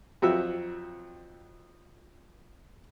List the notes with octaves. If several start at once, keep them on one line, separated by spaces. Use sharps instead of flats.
F2 F#3 C4 F#4 G4 E5